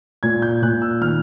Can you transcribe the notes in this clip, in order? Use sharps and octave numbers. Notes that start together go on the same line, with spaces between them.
A#2 G#6
G6
A#2 F#6
E6
D#3 F6